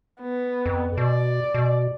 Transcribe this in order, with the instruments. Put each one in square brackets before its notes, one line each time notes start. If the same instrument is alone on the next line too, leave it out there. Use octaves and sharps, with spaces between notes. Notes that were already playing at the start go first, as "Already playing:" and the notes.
[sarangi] B3
[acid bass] F2
[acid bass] B2 [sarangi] D5
[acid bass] B2